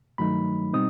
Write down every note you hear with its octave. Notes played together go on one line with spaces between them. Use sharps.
G2 D#3 F#3 A3 D#4 B5
B2 G3 C4 D#4 D#6